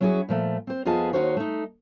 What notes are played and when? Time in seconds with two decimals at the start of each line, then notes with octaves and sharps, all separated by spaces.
0.01 F#3 C#4 E4 F#4 G#4
0.29 A#2 F3 A3
0.67 C4 C5
0.85 F2 B3 F4 G#4 D#5 A5
1.13 D#2 G#2 D#4 F#4 C5 C#5
1.37 A3 D#4